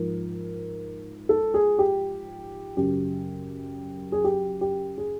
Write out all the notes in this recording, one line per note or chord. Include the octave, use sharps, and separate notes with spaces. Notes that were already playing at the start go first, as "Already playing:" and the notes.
Already playing: G#2 F3 A#4
A4
G#4
G4
F#2 C#3 F#3 G4
G#4
G4
G4
G#4